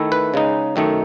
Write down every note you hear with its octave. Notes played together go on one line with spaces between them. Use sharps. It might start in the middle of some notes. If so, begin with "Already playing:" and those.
Already playing: D#3 A3 E4
B4
C#3 G#3 D#4
F#2 D#3 A3 D#4